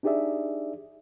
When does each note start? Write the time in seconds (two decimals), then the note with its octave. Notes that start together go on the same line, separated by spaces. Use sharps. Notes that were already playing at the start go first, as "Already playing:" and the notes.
0.03 D4 D#4 G4 G#4 D5 E5